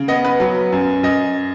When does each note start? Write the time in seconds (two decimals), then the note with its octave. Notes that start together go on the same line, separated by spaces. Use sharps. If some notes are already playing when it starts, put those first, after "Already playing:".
Already playing: C#3
0.08 B3 D#5
0.24 B4
0.40 F#3
0.72 F#2
1.03 F#2 D#5